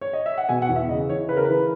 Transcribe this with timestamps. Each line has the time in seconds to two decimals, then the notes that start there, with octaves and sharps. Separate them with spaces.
0.01 C#5
0.13 D#5
0.26 E5
0.38 F#5
0.49 B2 G#5
0.62 F#5
0.69 E2
0.76 E5
0.89 C#3 D#5
1.09 E3 C#5
1.29 C#3 B4
1.37 A#4
1.45 E3 B4